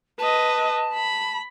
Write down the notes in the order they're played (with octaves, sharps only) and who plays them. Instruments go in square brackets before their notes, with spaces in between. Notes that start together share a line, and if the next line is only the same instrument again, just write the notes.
[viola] B4 D#5 [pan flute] A5
[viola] B5